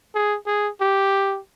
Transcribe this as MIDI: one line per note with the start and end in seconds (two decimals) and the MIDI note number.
0.15 0.36 68
0.46 0.69 68
0.81 1.39 67